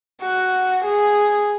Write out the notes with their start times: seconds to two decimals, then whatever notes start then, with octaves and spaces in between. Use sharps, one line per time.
0.22 F#4
0.85 G#4